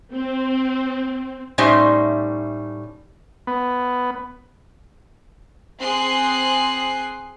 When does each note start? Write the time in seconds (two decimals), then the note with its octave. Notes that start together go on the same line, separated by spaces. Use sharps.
0.13 C4
1.58 A2 G3 A3 C#4 D#4 C5
3.47 B3
5.82 C4 G#4 G5 C6 F#6 C7